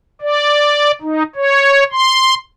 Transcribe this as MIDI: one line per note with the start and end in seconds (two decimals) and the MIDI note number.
0.21 0.91 74
1.02 1.23 63
1.36 1.84 73
1.92 2.34 84